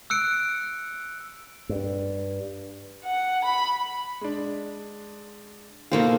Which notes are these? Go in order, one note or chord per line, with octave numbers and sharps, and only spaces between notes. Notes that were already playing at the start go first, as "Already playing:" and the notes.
E6 F#6 C#7 D7
G2
F#5
B5
G#3 D4
B2 D#3 A#3 F4 A4 C5